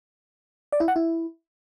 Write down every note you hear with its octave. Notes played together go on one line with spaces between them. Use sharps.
D5
E4
F#5
E4